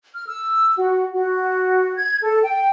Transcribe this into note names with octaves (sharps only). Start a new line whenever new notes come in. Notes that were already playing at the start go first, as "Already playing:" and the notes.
F6
E6
F#4
F#4
G#6
A4
G5